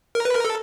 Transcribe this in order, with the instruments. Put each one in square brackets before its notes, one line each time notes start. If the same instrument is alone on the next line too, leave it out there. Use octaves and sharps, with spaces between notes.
[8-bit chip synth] A#4
B4
A#4
A4